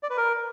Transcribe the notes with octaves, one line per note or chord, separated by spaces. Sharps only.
D5
B4
A#4